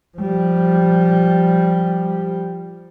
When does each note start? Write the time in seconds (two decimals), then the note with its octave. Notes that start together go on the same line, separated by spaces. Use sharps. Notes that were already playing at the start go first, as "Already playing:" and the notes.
0.17 F3 G3